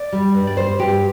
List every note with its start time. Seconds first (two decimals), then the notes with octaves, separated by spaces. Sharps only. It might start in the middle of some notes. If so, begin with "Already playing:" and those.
Already playing: D5
0.13 G3
0.34 G2
0.47 D5
0.57 G3 C5
0.79 G2 G4